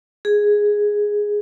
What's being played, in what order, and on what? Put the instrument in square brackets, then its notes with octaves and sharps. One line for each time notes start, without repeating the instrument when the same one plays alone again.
[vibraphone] G#4